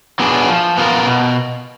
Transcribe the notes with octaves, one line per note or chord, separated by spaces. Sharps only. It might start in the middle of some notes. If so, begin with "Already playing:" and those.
F#3 B3 D4 G#4
F3
B3 F4 A#4
B2